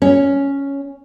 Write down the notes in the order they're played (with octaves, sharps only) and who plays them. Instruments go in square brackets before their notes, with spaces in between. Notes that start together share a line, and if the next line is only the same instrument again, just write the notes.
[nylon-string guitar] C#4